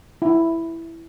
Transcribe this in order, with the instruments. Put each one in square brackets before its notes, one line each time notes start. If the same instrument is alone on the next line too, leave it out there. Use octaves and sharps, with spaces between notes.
[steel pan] E4